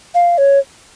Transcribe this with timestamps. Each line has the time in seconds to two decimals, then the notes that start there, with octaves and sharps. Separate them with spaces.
0.15 F5
0.38 C#5